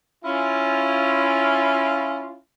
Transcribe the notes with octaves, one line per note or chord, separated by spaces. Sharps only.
C#4 E4 F4